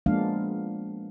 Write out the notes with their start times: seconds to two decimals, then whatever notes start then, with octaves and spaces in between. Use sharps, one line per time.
0.06 F3 G#3 A#3 B3 D4 F5